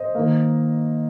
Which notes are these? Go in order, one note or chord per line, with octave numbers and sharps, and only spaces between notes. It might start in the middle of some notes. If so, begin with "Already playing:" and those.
Already playing: C5 D#5
D#3 A#3